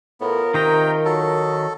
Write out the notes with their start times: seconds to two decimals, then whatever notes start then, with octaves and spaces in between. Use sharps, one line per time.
0.21 A2 B3 F4 A#4
0.54 C3 D#3 D#5 G5 A#5
1.05 F#3 A4